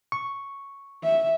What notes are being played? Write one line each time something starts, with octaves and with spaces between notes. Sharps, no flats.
C#6
E5